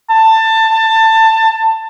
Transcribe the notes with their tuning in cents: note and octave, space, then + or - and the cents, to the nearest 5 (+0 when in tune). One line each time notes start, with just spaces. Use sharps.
A5 +20